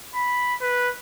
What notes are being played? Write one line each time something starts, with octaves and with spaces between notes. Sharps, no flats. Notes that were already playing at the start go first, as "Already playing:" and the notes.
B5
B4